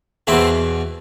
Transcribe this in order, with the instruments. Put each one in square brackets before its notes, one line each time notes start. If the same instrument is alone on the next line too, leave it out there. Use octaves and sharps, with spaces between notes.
[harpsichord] E2 B2 C4 E4